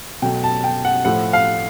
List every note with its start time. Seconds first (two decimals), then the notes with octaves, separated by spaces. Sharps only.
0.22 B2 F#3 A3 G5
0.43 A5
0.64 G5
0.85 F#5
1.05 A2 F3 A3 F#5
1.33 F5